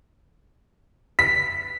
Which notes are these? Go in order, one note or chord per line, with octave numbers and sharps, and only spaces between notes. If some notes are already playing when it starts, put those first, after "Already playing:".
B6